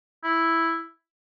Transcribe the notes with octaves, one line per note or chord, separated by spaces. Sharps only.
E4